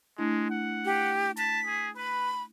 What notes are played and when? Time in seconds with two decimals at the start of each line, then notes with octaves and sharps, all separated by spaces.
0.18 G#3 A3 D4 E4
0.50 F#5
0.86 G4
1.38 A5 B6
1.67 G#4
1.97 B4 B5